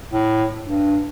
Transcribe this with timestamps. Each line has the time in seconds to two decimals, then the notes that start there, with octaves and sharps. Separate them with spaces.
0.11 A2
0.63 G2